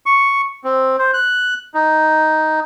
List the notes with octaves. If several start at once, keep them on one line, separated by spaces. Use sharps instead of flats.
C#6
C4
C5
F#6
D#4